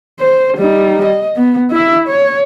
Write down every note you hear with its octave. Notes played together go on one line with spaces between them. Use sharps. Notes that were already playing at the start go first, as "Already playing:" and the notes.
C5
G3 D#4
D#5
B3
E4 E5
C#5